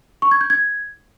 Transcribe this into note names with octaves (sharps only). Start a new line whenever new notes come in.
C#6
G#6
G6
G#6